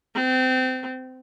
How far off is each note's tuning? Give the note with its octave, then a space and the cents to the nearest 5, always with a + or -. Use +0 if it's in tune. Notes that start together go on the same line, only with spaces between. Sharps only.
C4 -25